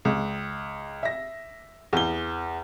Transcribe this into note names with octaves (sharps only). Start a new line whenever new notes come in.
C#2
E5 A#6
E2 G7